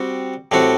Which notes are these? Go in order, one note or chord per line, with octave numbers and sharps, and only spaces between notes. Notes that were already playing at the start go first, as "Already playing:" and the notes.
Already playing: G3 C4 F#4
A2 G3 C4 F#4